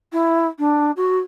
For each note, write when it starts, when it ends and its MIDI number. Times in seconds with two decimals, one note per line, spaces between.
0.13 0.46 64
0.59 0.91 62
0.96 1.18 66